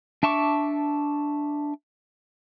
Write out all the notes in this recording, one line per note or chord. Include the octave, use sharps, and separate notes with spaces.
D4 E5 A5 C#6 D6